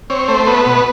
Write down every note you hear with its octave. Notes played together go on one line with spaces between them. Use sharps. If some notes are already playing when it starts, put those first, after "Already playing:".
C4 C#5
A3 C5
B3 B4
B2